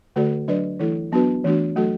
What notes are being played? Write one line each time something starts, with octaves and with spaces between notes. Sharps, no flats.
D3 A3 F#4 A4 D5
F#3 D4 B4 D5
E3 A3 E4 A4
F#3 B3 D4 F#4 B4
E3 A3 D4 F#4
F#3 A3 F#4 A4